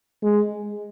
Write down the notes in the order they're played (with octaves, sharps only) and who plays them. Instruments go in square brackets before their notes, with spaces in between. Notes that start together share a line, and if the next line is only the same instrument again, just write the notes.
[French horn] G#3